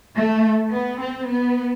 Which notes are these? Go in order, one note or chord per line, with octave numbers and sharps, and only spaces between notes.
A3
B3
C4
B3